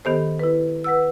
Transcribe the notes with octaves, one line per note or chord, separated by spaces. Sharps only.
D#3 B3 G4 A4 C5
E4 B4
B4 F#5 E6